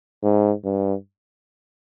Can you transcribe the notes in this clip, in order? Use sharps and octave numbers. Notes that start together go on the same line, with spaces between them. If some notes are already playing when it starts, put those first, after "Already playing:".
G#2
G2